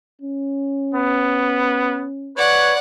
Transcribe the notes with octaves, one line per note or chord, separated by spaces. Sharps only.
C#4
B3
B4 C#5 D5 F#5